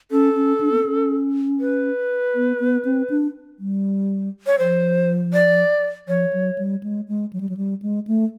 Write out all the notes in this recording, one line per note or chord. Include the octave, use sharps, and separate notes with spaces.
C#4 A4
C#4
D4
B3
C4
C#4
B4
B3
B3
C4
D4
G3
C#5
F3 C5
D5
F3 C#5
F#3
G3
G#3
G#3
F#3
G3
F#3
G3
G#3
A3